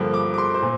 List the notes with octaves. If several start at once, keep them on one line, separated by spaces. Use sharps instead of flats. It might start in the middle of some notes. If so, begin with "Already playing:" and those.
Already playing: G2 D3 F3 A#3
D6
D6
C6
C5
A#2